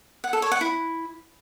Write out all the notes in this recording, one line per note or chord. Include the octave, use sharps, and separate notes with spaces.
F#5
A4
C#5
F#5
E4